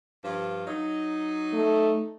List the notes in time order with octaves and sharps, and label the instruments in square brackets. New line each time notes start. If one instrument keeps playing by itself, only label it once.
[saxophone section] G2 F3
F#3 D#4
[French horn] A3